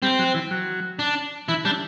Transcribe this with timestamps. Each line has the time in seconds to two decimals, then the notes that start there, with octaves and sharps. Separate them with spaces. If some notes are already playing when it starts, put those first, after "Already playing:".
0.02 G3 C4
0.19 F#3
0.35 E3
0.51 F#3
0.99 D4
1.48 E3 E4
1.65 G3 D4